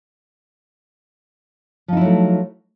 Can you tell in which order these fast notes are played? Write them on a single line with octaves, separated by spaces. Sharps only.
F3 D#4 E4 F#3 A3